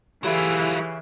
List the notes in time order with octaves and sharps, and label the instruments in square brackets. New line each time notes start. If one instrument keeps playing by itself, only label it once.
[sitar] C#3 E4 [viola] E3 [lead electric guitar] F#3 F4 [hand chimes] G4 A4 B5